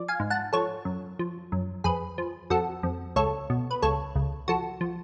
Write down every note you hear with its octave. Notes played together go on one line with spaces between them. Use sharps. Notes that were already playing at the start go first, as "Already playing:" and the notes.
Already playing: F3 D5
F5 G#5
G#2
F#5 A5
F3 A4 C#5
F#2
F3
F#2
F2 G#4 B4
F3
F2 F#4 A4
F2
C#2 A4 C#5
B2
B4
C#2 A4 C#5
C#2
F3 F#4 A4
F3